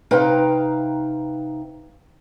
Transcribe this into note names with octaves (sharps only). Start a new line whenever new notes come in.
C3 D#4 B4 F5 G5 A#5